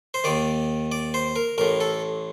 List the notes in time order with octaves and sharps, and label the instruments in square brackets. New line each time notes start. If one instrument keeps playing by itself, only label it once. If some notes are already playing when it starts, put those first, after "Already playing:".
[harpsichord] C5
D#2 D#3 D5
D5
C5
A#4
A1 A2 A#4
A4